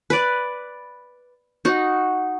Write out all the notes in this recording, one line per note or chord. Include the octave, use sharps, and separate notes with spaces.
B4 D5
D#4 F#4